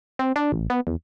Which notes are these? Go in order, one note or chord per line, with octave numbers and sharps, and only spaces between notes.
C4
D4
A1
B3
E2